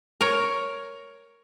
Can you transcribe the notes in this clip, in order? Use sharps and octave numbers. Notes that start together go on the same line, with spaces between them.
A#4 C#5